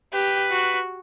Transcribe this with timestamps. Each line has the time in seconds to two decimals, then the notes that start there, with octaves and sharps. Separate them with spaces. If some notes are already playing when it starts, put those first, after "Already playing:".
0.13 G4 B4
0.50 F#4